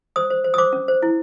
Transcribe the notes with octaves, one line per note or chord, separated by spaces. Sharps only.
C5 D#6
C5
C5
D#6
C5 D6
C#4
C5
E4